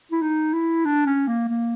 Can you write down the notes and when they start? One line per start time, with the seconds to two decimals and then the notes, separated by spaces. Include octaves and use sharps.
0.12 E4
0.22 D#4
0.54 E4
0.85 D4
1.06 C#4
1.28 A#3
1.48 A#3